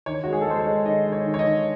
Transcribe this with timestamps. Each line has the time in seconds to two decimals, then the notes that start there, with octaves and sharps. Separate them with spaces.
0.06 D#3 C#5
0.24 G#3 F#4
0.33 G#4
0.41 A4
0.46 G#3 C5
0.59 C#5
0.65 G#3
0.85 D#3 D#5
1.06 G#3
1.12 C#5
1.26 D#3
1.34 C#5
1.39 D#5
1.45 D#3